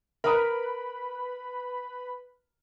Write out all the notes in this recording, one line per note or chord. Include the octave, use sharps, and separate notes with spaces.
A#4 B4 B5 D#6